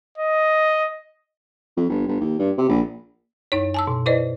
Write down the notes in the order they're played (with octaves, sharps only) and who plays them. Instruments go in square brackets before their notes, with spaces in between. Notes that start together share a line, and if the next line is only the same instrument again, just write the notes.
[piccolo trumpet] D#5
[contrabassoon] F2
G1
G1
D#2
G2
C3
A#1
[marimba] F#2 D#4 C#5
G#5 A5 E6
B2
E4 B4 C5 D5 D#5